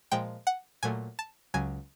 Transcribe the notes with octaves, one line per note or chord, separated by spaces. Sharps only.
A#2 F3 G#3 G5
F#5
A#2 F#3 A3 G#5
A5
C#2 C#3 F#3 G#5